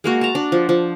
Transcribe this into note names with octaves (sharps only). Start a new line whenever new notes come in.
G#3 A#3 F#4
A5 A#5
D4
F3
F3